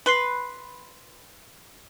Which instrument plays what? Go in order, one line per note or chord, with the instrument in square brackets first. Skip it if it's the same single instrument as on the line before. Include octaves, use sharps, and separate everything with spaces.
[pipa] B4 [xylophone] B5 C6 C7